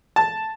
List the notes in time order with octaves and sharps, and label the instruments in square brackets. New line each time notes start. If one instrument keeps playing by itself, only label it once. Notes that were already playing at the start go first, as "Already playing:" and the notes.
[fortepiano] A5